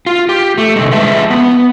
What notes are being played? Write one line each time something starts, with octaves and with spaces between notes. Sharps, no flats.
F4
G4
A3
C3 D#3 G3 G#3
F3 G#3 B4 E5 A5
B3